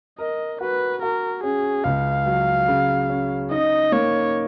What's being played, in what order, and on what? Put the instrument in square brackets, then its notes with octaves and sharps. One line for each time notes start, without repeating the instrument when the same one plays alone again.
[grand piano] A#4 [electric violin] D#5
[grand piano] F#4 [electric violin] B4
[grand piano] F#4 [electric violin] A#4
[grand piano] C#4 [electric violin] G#4
[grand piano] C#2 [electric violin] F5
[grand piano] F#3
C#3
C#4
[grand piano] D#4 [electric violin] D#5
[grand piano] A#3 [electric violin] C#5